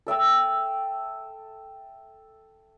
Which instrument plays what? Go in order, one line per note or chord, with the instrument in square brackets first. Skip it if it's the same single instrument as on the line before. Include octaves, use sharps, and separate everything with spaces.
[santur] A4 E5 G5 E6